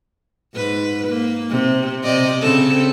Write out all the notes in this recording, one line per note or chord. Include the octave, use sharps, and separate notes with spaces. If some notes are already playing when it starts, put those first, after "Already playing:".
G#2 B4
A#3
C3
C3 D5 D#5
C#3 C4 A4